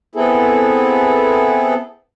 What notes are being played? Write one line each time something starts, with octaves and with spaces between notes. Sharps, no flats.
B3 C4 E4 G#4 A4